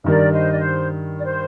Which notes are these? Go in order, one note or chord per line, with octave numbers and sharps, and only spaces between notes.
G2 D#3 G3 A#4 D5
C5 D#5
D5
C5
D5
C5